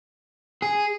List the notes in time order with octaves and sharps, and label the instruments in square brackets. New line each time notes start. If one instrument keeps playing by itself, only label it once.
[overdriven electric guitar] G#4